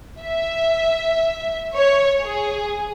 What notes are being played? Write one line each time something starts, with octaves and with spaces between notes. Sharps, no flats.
E5
C#5
G#4